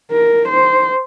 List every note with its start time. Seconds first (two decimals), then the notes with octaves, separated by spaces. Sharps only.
0.12 A#4
0.48 C5